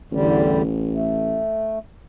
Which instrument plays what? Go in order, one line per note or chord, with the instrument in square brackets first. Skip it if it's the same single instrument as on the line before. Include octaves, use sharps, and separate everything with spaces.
[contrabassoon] A1 [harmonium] E2 D3 G3
[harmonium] A3